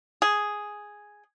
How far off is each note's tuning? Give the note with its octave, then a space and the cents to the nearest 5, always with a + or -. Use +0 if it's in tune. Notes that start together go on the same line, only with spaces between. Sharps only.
G#4 +0